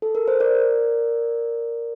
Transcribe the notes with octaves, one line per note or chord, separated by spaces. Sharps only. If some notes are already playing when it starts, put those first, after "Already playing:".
A4
A#4
C5
A#4 D5